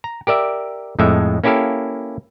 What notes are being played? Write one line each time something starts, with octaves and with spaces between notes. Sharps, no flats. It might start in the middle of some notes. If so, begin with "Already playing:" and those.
A#5
G4 A#4 D5 E5
F2 A2 G#3 E5
A#3 C#4 E4 G4 A4 F5